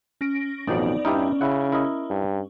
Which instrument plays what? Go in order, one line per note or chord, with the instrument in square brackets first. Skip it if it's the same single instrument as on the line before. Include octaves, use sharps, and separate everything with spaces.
[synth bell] C#4 A#6 D7
[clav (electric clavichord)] A1 B2 F#3 [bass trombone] F2 [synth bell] B3 D#4 D5
[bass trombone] G2 [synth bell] C#4 [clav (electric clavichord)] D#4 E4 G4
[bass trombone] C#3 [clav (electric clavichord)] E4 F#5
[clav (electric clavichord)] E4 A#4 D#5
[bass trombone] G2